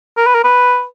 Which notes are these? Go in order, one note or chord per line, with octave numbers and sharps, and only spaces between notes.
A#4
B4
A#4
B4